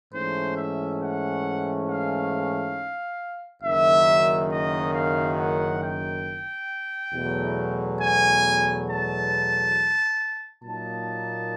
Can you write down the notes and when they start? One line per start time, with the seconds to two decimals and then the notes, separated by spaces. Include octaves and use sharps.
0.12 G#2 E3 A3 C#4 C5
0.56 E5
0.99 F#5
1.87 F5
3.62 F#1 F#2 D#3 E5
4.50 D#5
4.93 F5
5.37 F#5
5.82 G5
7.13 E2 B2 F#3 A3
8.00 G#5
8.87 A5
10.63 A#2 F#3 A#3 D#4 A5